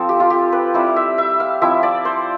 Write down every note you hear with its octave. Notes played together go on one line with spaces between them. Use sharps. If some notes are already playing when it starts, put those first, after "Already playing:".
Already playing: F3 C4 A4
G4
F4
G4
B4
G3 C4 E4 C5
E5
E5
F5
F3 C4 E4 E5
D5
C5